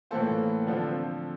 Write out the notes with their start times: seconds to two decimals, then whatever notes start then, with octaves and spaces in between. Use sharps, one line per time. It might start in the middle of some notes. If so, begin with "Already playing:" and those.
0.11 A2 E3 A#3 F4 A4 C5
0.67 D3 F3 C4 F4